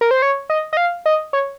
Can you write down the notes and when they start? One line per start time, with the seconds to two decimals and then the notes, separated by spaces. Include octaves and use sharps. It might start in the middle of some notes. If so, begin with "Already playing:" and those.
0.01 A#4
0.11 C5
0.22 C#5
0.50 D#5
0.73 D#5
0.77 F5
1.06 D#5
1.33 C#5